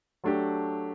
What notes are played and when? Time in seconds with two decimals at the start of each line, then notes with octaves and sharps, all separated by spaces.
0.24 F#3 A3 D4 G4